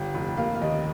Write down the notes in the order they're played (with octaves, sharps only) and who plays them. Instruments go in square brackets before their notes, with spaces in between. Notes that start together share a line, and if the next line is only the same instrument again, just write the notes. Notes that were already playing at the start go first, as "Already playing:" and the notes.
Already playing: [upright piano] G1 G3 G5
F1
A#3 F5
F5
D#2 D#5